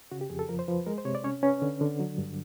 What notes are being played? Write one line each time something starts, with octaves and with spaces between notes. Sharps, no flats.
C#3 F#4
G4
F2 G#4
A4
F3 A#4
C5
F3 B4
G#3 A#4
C5
C3 C#5
D5
C#4 C#5
C#4 B4
D3
D3
F#3
G2